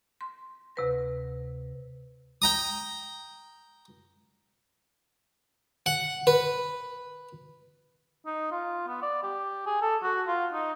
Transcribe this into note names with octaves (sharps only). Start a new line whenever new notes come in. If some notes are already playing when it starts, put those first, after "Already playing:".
C6
D2 C3 B4 A#6
G5 A#5 D#6
F#5
B4
D#4
F4
B3
D5
G4
G#4
A4
F#4
F4
D#4